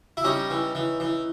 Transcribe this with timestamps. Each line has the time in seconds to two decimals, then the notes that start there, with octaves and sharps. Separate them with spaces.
0.17 E4
0.24 G3 C#4 D#4
0.50 E3
0.75 E3
1.00 E3